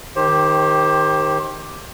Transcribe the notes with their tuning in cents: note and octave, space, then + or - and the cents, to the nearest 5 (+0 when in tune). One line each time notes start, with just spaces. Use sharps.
D#3 +0 G4 +0 C5 +30